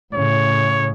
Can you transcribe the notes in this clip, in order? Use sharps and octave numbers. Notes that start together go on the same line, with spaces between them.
A2 C#3 C#5